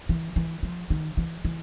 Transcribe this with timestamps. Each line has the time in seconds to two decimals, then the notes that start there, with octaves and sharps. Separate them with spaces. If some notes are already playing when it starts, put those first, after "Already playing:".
0.09 E3
0.36 E3
0.63 F3
0.90 D#3
1.17 E3
1.45 E3